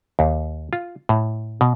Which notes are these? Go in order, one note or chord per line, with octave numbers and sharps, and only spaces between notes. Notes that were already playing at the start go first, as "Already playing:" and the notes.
D#2
F4
A2
B2